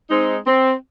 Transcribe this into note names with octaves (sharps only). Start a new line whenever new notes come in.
G#3 C4 D#4
C4